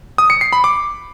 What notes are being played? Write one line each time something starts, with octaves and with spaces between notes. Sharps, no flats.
D#6
C#7
C7
B5
D6